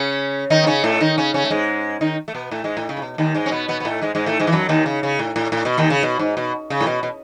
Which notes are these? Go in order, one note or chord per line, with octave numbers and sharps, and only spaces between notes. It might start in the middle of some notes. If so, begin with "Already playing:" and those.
Already playing: C#3 C#4
D#3 D#4
B3
C#3 C#4
A2 A3
D#3 D#4
C#3 C#4
C#3 C#4
A3
G#2 G#3
D#3 D#4
A3
B2 B3
A2 A3
G#2 G#3
A2
C#3
A2
B2
D#2 D#3
G#2 G#3
C#4
B2 B3
B2 B3
B3
A2 A3
G#2 G#3
G#2 G#3
A2 A3
G#2 G#3
E3
F#2 F#3
D#2 D#3
C#3
C#3
A2
A2
A2
B2
D#2 D#3
C#3
B2
G#2
B2
C#3
A2
B2
B2